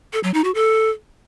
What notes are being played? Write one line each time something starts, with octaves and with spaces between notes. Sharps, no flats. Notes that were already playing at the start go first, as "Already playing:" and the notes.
A4
F#3
D#4
F#4
A4